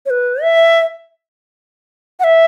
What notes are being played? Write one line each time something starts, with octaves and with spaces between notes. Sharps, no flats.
C#5
B4
E5
F#5
E5